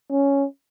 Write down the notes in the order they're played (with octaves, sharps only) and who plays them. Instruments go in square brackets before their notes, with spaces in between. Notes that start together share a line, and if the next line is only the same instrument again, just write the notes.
[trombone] C#4